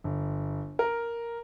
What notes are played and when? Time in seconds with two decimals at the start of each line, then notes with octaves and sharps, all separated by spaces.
0.04 G1
0.79 A#4